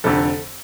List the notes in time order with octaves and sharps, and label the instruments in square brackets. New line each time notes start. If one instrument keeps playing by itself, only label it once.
[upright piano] F1 F2 D3 A4